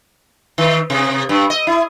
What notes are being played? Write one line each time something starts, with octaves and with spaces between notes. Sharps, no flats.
D#3
C3
G2
D#5
E4